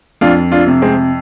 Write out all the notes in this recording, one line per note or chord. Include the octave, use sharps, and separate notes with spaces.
F2 D4 F4
D4 F4
C3
G#3 C4